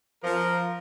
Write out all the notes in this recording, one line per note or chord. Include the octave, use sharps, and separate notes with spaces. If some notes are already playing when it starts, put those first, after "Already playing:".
F3 A#4